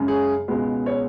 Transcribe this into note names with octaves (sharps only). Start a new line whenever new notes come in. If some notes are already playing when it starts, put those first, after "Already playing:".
Already playing: F#2 C#3 G#3
G#4
C#2 B2 G#3 B3
C#5